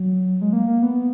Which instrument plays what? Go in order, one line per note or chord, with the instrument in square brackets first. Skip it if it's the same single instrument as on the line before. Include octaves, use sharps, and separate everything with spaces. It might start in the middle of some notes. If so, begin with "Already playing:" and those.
Already playing: [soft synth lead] F#3
G#3
A#3
A#3
B3